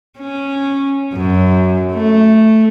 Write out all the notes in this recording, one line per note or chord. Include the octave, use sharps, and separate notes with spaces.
C#4
F#2
A3